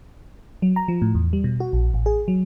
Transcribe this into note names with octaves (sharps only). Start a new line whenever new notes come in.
F#3
A#5
F3
A2
E2
G3
B2
F#4
A#1
A1
G#4
F#3